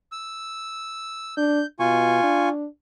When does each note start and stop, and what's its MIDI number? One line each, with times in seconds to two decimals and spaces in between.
0.12 1.35 88
1.37 1.63 62
1.37 1.66 91
1.79 2.20 47
1.79 2.49 65
1.79 2.49 80
1.79 2.49 85
2.23 2.66 62